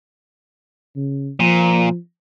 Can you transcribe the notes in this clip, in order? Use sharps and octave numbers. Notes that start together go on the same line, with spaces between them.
C#3
A#2 F3